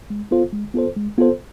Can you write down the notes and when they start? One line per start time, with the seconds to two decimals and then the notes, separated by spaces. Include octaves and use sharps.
0.10 G#3
0.31 B3 F4 A4 C5
0.53 G#3
0.74 B3 F4 A4 C5
0.96 G#3
1.18 B3 F4 A4 C5